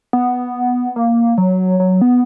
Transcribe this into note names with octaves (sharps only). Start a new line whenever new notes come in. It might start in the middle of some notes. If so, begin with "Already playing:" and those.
B3
A#3
F#3
F#3
B3